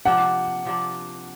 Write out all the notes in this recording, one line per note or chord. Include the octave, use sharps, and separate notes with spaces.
C3 F3 A#3 D4 F#5
C3 F3 A#3 D4